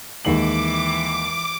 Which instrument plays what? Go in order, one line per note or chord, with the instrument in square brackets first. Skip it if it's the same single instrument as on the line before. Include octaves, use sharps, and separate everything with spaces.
[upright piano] D#2 G#3 F#7 [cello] E3 [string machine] D6